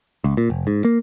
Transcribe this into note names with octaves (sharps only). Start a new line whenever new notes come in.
C#2
A#2
F1
G#2
A#3